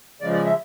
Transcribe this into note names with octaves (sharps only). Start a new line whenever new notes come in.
C#3 F3 G#3 D5
D5
E5